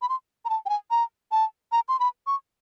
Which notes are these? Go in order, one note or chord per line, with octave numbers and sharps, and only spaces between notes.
B5
C6
A#5
A5
G5
G#5
A#5
A5
A#5
C6
B5
C#6